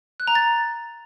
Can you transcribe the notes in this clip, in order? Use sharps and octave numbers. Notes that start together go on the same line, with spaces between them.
F#6
A#5
A6